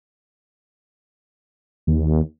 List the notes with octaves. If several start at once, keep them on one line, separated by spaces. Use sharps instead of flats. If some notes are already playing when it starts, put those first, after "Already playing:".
D#2